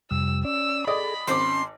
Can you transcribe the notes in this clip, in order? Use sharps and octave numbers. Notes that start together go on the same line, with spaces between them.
F2 C3 G3 E6
C#4 D5 E6
G#4 A4 D5 D#5 B5 D#6
G#1 C#4 C5 C6 D6